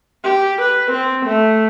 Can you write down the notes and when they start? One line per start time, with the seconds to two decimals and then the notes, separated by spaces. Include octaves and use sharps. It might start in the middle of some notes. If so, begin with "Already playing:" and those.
0.24 G4
0.62 B4
0.91 C4
1.26 A3